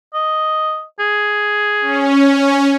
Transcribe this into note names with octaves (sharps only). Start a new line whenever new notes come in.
D#5
G#4
C#4